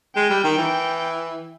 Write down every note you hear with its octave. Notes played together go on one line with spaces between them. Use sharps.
G#3 G5
G3
D#3
E3